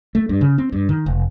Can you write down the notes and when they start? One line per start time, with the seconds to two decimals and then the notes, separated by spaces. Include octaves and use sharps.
0.15 A3
0.29 G2
0.41 C#3
0.58 C4
0.73 G2
0.89 D#3
1.06 F1